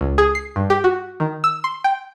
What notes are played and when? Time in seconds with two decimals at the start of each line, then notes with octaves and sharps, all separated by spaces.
0.01 C#2
0.18 G#4
0.35 C7
0.56 G2
0.70 G4
0.84 F#4
1.20 D#3
1.44 E6
1.64 C6
1.84 G5